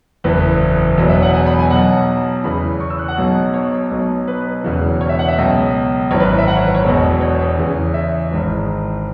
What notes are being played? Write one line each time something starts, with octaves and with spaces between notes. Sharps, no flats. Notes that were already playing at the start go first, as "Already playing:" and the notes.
F#1 E2 E3 B4
E1 E2 B2 F#3
E5
F#5
G#5
B5
G#5
B1 B2 F#3 F#5
E2 C#3 E3 B5
C#6
E6
F#6
F#5
B1 B2 F#3
C#5
B1 B2 F#3
B4
E1 E2 C#3 E3
C#5
E5
F#5
E5
C#2 B2 F#3
G#1 F#2 E3 C#5
B4
E5
F#5
C#5
B4
C#5
E1 E2 B2
C#5
E2 C#3 E3
E5
G#1 G#2 E3